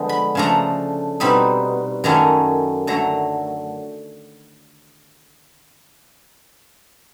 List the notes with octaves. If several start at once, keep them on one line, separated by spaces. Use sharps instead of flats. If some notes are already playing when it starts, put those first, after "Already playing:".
Already playing: D3 F3 G#3 B3
B5
C#3 F3 A3 D4 A#5
B2 G3 C4 D#4 B5
F#2 D#3 F#3 A3 C#4 A#5
D3 F#3 A3 A#5